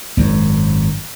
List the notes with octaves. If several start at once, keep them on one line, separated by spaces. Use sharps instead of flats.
G#1 F#2